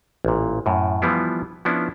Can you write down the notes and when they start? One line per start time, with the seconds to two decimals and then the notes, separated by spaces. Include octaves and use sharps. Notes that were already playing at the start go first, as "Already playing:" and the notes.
0.25 A1 A#2
0.66 F#2 A2
1.02 E3 F3 G3 B3 E4 F4
1.65 F3 B3 C#4 D4 E4